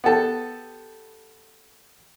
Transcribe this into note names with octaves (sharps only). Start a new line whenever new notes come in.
B3 G4 A4